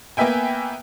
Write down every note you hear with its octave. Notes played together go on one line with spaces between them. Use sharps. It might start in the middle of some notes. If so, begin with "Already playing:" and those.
A#3 B3 B4 E5 G5 G#5